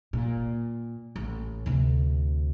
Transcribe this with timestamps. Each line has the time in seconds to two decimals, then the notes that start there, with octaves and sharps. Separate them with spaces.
0.13 A#2
1.16 A1
1.66 D2 C3